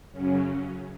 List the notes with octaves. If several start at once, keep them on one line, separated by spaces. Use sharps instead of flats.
F#2 C#3 F#3 C#4